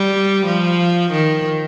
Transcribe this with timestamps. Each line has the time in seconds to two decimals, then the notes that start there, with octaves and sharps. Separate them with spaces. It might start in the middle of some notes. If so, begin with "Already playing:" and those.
Already playing: G3
0.46 F3
1.11 D#3